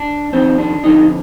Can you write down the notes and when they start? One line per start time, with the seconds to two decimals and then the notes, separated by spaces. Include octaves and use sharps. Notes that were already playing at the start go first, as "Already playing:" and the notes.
Already playing: D4
0.32 F2 D#3 C4
0.58 D4
0.84 F2 D3 D#4